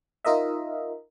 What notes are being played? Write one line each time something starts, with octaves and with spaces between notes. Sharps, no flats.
D#4 F4 A#4 D#5 E5